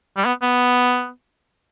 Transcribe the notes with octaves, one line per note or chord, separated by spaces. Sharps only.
G3
B3
B3